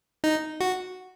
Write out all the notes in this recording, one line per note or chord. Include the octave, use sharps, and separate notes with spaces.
D#4
F#4